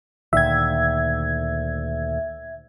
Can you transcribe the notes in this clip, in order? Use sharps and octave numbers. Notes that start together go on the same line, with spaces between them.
D2 A#2 D#3 E5 G#6